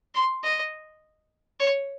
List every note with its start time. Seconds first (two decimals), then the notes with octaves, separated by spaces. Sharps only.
0.14 C6
0.43 D#5
1.60 C#5